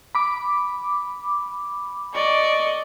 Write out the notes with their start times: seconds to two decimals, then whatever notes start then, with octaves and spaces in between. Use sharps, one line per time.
0.15 B5 D6
2.13 D5 D#5 C#6